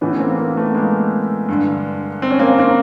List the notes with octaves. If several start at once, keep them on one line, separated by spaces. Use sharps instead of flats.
A2 E3 B3 C#4
A#3 C4
A#3 C4
A3 B3
G#3 A#3
G2 D3
C4
C#4
A#3 C4
A#3 C4